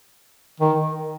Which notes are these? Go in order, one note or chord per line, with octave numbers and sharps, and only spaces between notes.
D#3